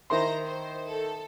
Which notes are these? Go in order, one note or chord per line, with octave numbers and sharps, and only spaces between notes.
D#3 E4 C5 A#5 C6 A#6
C5
A4